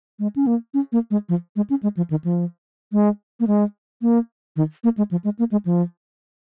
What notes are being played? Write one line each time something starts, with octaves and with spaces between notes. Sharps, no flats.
G#3
C#4
A#3
C#4
A#3
G#3
F3
G#3
C#4
G#3
F3
D#3
F3
G#3
A#3
G#3
A#3
D#3
A#3
G#3
F3
G#3
A#3
G#3
F3